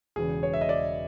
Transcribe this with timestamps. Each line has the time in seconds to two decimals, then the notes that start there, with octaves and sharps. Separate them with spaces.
0.16 E1 E2 C#3 G#4
0.43 C#5
0.54 E5
0.61 D#5
0.69 D5